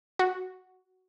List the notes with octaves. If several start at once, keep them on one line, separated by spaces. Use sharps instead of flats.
F#4